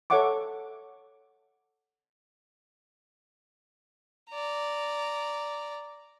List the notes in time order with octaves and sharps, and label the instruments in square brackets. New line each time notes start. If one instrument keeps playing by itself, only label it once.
[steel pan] A4 C#5 E5 F#5 C#6 D6
[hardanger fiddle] D5 A#5